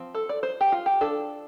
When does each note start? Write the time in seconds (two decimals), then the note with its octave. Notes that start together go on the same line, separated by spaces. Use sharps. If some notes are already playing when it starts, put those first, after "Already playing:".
Already playing: F3 C4
0.15 A4
0.29 D5
0.43 C5
0.61 G4
0.72 F4
0.86 G4
1.01 F3 D4 A4